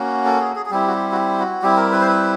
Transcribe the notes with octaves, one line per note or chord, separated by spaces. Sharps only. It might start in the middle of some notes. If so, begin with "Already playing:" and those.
Already playing: A#3 C#4 F#4
A4
G#4
G#4
G#4
G3 C4 E4 G4
F#4
G4
F#4
G4
F#4
G3 C4 E4 G4
A#4
B4
C5
B4